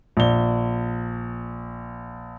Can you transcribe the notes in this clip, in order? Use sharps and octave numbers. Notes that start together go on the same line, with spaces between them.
A#1 G7